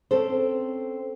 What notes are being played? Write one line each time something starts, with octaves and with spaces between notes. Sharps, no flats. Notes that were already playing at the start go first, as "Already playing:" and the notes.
C4 C#4 A4 C5